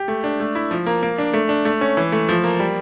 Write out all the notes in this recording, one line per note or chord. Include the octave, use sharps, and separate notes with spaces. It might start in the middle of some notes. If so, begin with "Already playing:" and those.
Already playing: G4
A3
D4
A3
E4
F3
A#3
A#3
D4
A3
D4
A3
C#4
E3
A3
F3
A#3
G3